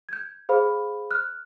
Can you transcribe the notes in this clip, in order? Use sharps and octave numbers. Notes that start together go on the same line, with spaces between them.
G6 G#6
G#4 C5 F5 B5
F6 F#6